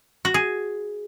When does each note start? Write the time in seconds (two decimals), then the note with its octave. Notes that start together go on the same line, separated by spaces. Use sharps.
0.25 F#4
0.34 G#4